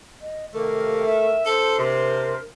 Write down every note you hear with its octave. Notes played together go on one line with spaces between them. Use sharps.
D#5
C3 D#3 A3 A#3 A#4
E5
D4 A4 C5
C3 A#4